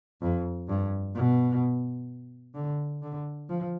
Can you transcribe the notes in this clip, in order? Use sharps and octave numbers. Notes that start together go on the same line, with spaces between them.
F2
G2
B2
D3
D3
F3